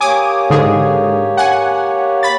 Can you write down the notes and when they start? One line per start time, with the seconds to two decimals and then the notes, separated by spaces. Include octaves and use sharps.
0.01 A#3 G4 C#5 G#5 D6 D#6
0.50 G#2 D3 G#4
1.37 F#5 G#5
2.23 B5 A6